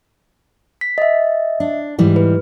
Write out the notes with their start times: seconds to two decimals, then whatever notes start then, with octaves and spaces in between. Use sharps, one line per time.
0.81 B6
0.98 D#5 E5
1.60 D4
1.98 G#2 E3 G3
2.16 B4